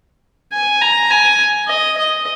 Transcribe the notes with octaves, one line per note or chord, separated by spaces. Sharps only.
G#5
A#5
G#5
D#5
D#5